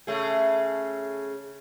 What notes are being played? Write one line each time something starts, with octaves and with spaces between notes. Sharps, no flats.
C#3 A3 G#4